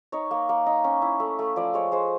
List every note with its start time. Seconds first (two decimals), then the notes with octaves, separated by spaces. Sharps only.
0.12 D#4 C#5
0.31 A#3
0.49 A#3
0.66 D#4
0.84 C#4
1.02 E4
1.20 A3
1.39 A3
1.56 F3 D5
1.74 G#3 C#5
1.92 G#3 C5